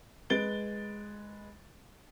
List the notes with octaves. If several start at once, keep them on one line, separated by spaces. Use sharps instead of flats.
G#3 B4 A6 D7 G7